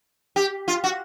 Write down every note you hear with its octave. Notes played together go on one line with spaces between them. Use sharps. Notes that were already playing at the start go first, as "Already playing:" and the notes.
G4
F4
F#4